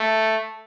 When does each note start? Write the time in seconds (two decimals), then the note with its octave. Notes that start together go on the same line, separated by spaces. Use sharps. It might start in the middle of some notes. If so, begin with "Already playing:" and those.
Already playing: A3